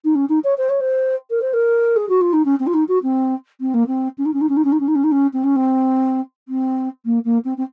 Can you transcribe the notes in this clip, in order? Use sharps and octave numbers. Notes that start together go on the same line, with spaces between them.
D#4
C#4
D#4
C#5
C5
C#5
C5
A#4
C5
A#4
G#4
F#4
F4
D#4
C#4
C4
F4
D#4
F#4
C4
C4
A#3
C4
C#4
D#4
C#4
D#4
C#4
D#4
C#4
D#4
C#4
D#4
C#4
D#4
C#4
C4
C#4
C4
C4
A#3
A#3
C4
C4